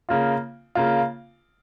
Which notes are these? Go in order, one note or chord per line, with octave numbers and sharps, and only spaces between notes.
C#3 A#3 F4
C#3 A#3 F4